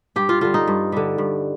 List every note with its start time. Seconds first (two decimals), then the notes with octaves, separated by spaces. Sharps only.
0.16 G2 G4
0.29 F4
0.41 D3 G3 F4
0.54 D#4
0.67 G2
0.92 D3 G3
1.18 G2